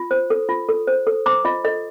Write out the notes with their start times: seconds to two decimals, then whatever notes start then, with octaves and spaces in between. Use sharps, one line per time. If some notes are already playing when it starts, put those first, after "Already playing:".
Already playing: F4
0.11 C5
0.30 A4
0.49 F4
0.69 A4
0.87 C5
1.07 A4
1.26 C5 A#5 D6
1.45 F4 D#5
1.64 A4 D#5